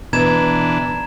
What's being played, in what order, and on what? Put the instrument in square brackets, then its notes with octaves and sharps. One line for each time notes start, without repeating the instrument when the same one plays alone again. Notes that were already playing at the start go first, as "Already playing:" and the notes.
[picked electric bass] B2 B3 [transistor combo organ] E3 D4 [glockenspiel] A#5 G#6 E7